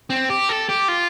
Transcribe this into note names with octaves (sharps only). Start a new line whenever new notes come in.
C4
G4
A4
G4
F4